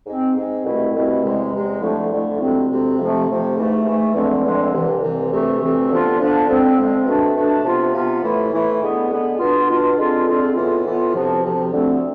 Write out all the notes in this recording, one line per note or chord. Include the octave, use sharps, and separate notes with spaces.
G#2 G#3 C4
G#2 G#3 C4
C2 B2 A3 C4 E4
C2 B2 A3 C4 E4
E2 C3 G#3
E2 C3 G#3
F2 D3 F3 A3 E4
F2 D3 F3 A3 E4
D2 C3 G#3 C4
D2 C3 G#3 C4
F2 C3 F3 A3
F2 C3 F3 A3
G#2 E3 A3
G#2 E3 A3
E2 D3 F3 G#3 C4
E2 D3 F3 G#3 C4
C2 C3 E3
C2 C3 E3
D2 C3 E3 A3 C4
D2 C3 E3 A3 C4
D3 F3 B3 D4 F4
D3 F3 B3 D4 F4
D3 F3 G#3 C4
D3 F3 G#3 C4
B2 A3 D4
B2 A3 D4
C3 F3 B3 F4
C3 F3 B3 F4
A2 E3 A3 E4
A2 E3 A3 E4
D3 G#3 B3
D3 G#3 B3
B2 B3 D4 F4
B2 B3 D4 F4
D3 G#3 C4 F4
D3 G#3 C4 F4
A2 E3 B3 F4
A2 E3 B3 F4
D2 C3 F3
D2 C3 F3
D2 D3 A3 C4